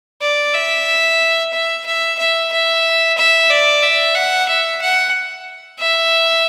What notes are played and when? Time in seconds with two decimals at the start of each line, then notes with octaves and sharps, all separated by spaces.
0.22 D5
0.55 E5
1.53 E5
1.86 E5
2.19 E5
2.52 E5
3.17 E5
3.50 D5
3.83 E5
4.15 F#5
4.48 E5
4.81 F#5
5.80 E5